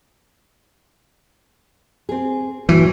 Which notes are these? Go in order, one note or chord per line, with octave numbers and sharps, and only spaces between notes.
C4 G#4
G2 A#2 E3 F#3